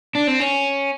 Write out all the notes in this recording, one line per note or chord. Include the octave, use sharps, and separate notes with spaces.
D4
C4
C#4